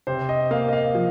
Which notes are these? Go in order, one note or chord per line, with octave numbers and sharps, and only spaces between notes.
C3 C5
D#5
A#3 F5
D#5
F5
F3